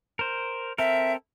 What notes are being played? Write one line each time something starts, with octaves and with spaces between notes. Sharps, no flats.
A#4 C5
C4 A4 A#4 E5